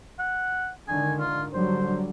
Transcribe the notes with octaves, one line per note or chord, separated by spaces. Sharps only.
F#5
G#2 D3 D#3 G#5
F4
D3 F#3 G3 C5